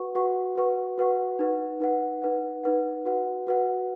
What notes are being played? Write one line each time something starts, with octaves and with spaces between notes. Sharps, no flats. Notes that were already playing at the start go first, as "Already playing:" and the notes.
Already playing: F#4 B4 F#5 C#6
F#4 B4 F#5 C#6
F#4 B4 F#5 C#6
F#4 B4 F#5 C#6
D#4 B4 F#5
D#4 B4 F#5
D#4 B4 F#5
D#4 B4 F#5
F#4 B4 F#5
F#4 B4 F#5